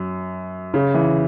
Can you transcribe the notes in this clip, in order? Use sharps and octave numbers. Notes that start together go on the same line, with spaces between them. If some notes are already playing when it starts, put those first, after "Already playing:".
Already playing: F#2
C#3
E3